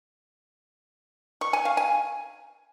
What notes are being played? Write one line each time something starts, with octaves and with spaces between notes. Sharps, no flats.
C#6
G#5
F5
G#5